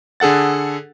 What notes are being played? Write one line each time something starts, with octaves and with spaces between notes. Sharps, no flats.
D3 G#4 A4 F#5 A6